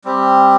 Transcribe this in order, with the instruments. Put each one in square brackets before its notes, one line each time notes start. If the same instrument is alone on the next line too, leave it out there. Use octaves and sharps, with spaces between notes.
[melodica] G3 C4 G4